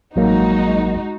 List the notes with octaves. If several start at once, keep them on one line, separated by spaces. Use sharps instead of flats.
A1 F#3 G#3 A#3 D#4 F#4